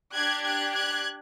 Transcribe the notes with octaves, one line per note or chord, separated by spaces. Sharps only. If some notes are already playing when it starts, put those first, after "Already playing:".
D4 G4 F#6 G#6
F#6 G#6
F#6 G#6